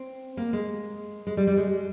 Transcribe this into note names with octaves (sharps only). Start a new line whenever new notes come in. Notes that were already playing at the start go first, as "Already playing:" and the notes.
Already playing: C4
A#3
G#3
G#3
G3
G3
G#3